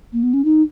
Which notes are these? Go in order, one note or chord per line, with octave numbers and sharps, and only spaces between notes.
A#3
B3
C#4
D#4